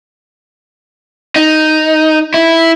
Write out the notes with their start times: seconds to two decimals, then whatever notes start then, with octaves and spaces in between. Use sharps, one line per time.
1.36 D#4
2.34 E4